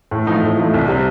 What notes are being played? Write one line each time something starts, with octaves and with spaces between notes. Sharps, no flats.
A2
F3 A3 D#4
A2
F3 A3 D#4
C2
C3 G3 C4